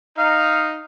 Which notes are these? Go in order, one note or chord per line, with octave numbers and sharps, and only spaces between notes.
D#4 F5